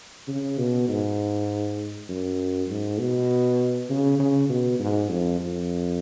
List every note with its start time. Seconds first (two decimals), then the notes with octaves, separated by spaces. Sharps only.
0.28 C#3
0.58 B2
0.88 G#2
2.09 F#2
2.69 G#2
3.00 B2
3.89 C#3
4.19 C#3
4.49 B2
4.80 G#2
5.09 F2
5.39 F2